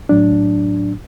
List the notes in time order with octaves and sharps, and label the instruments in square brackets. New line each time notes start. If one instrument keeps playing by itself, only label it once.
[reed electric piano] A2 F#3 D4